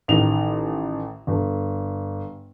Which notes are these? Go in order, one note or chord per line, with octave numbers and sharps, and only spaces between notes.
A1 D#3 F7
G1